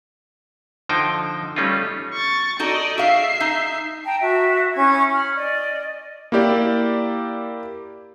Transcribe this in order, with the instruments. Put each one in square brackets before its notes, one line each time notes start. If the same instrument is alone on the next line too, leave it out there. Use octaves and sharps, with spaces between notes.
[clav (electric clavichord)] D3 F3 D#4 C5 G5
G3 A3 C#4 D#4 F4
[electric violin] C#6 A6
[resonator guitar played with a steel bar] D#4 F#4 A4 [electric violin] D5 D#5
[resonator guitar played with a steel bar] F#4 G#4 F5 [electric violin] E5 C7
[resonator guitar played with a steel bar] D#4
[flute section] G5 A5 A#5
F#4 E5
C#4 E4 C#6 G#6
B5 F6
D5 D#5
[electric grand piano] A#3 E4 G4 D5